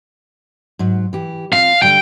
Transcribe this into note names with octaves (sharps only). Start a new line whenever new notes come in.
G#2 F#3
E3 G4
C4 F4 F5
D3 G3 F5 G5